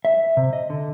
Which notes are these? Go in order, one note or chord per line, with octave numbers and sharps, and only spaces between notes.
E5
C3
D#5
D3